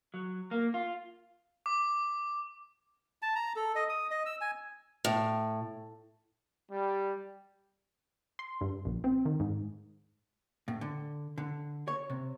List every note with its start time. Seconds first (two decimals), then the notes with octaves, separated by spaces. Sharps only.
0.14 F#3
0.51 A#3
0.74 F4
1.66 D6
3.22 A5
3.36 A#5
3.56 A4
3.75 D#5
3.89 D#6
4.11 D#5
4.26 E6
4.41 G#5
5.05 A2
6.70 G3
8.39 C6
8.61 G2
8.85 A#1
9.04 C4
9.25 D#3
9.40 G#2
10.68 A2
10.81 D3
11.38 D3
11.88 C#5
12.10 C3